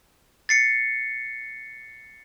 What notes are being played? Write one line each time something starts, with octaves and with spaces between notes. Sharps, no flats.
A6 C7 C#7